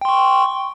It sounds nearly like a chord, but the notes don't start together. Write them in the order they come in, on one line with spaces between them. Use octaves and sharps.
G5 C6 C#6